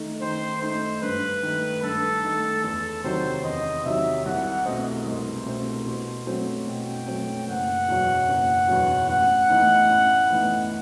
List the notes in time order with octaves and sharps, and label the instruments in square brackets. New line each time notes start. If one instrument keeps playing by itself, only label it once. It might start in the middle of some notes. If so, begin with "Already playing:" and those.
Already playing: [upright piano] D#3 A3 D#4
[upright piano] D#3 [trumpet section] C5
[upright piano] A3 D#4 [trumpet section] C5
[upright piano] G2 [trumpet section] B4
[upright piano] D#3 A3
[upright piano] G2 [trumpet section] A4
[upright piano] D#3 A3
[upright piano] E2 [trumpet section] A4
[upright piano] C3 D#3 F#3 [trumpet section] C5
[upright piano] E2 [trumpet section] D#5
[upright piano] C3 D#3 F#3 [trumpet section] E5
[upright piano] C2 [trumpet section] F#5
[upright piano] B2 A3 C4 [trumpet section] D#5
[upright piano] C2 [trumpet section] C5
[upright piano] B2 A3 C4
B2
F#3 A3 C4
[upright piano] B2 [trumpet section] G5
[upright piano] F#3 A3 C4
[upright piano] F#1 [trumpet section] F#5
[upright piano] E2 B2 F#3
F#1
E2 B2 F#3
[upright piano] A1 [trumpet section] F#5
[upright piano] A2 E3 B3 D#4
A1
A2 E3 B3 D#4